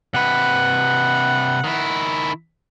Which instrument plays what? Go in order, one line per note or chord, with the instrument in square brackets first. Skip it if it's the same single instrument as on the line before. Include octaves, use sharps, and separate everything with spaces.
[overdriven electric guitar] C3 B4 [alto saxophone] F#5
[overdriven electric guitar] D#3 E4